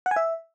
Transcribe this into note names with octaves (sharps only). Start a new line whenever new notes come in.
F#5
G#5
E5